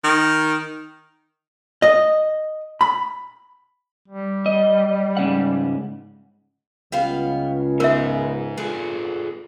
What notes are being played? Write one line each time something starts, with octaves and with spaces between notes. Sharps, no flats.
D#3
D#5
B5
G3
D#5
G#2 C#3 F#5
C#2 C#3 G3 B3 F5
G#3 B3 D#4 A#4 E5
F4 G#4 A4 B4